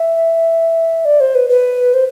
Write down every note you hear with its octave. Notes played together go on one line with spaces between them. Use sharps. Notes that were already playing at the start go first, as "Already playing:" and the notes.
Already playing: E5
D5
C5
B4
B4
C5